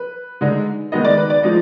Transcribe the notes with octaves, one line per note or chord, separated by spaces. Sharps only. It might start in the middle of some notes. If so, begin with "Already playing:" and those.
Already playing: B4
D3 G#3 D#4
D#3 G#3 B3 D#4 D#5
D5
B4
D5
F3 G#3 D#4